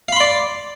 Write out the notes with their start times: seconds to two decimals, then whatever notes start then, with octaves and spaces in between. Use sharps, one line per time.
0.08 F5
0.12 B5
0.16 C6
0.20 D5